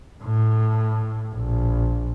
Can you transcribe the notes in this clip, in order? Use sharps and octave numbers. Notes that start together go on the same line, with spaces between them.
A2
A#1